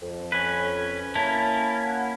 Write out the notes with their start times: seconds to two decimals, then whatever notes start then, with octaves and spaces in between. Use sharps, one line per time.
0.02 F2
0.32 C#4 B4
1.15 A#3 C#4 E4 A5
1.86 F#5